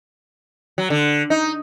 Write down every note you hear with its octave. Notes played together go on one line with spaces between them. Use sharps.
F#3
D3
D#4